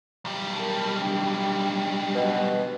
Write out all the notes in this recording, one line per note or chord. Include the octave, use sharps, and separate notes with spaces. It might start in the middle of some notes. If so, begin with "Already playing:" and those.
B1 G3
A#4 A5
D4 G5
B2